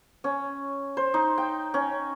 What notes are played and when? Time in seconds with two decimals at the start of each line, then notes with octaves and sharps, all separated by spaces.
0.24 C#4
0.97 C5
1.14 D#4
1.38 G5
1.74 C#4